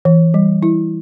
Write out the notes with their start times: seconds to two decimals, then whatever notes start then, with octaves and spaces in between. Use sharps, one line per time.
0.05 E3
0.34 G3
0.63 E4